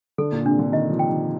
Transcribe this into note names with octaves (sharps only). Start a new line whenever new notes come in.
D3 A4
A#2
C3 D4
D3
D#3 D#5
F3
G5
D#3